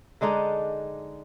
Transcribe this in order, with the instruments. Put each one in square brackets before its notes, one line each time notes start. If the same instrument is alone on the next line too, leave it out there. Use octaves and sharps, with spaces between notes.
[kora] D3 G#3 D4 D#4